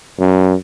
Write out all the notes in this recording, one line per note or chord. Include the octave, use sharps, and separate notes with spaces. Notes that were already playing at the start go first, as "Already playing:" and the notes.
F#2